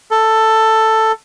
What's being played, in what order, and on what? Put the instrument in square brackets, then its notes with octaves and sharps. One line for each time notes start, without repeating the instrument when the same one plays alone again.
[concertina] A4